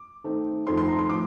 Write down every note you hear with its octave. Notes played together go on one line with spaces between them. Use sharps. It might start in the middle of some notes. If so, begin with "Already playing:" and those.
Already playing: D6
D#3 A3 C4 D#4
F2 D#3 A3 C4 D#4 C6
C6
A#5
C6
A2 F3 D6